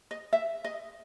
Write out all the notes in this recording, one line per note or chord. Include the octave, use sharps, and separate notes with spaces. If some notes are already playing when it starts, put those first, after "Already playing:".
D#5
E5
D#5